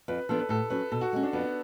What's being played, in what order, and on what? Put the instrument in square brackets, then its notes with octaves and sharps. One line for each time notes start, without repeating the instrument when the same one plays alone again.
[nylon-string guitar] F2 [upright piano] B4
[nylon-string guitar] F3 B3 D4 [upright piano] A4
[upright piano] B4
[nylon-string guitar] A2 [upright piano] A4
[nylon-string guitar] F#3 C#4 [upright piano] B4
[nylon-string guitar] B2 [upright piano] A4
[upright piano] F#4
[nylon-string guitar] G#3 C#4
[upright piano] D4
[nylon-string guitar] F2 [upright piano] B3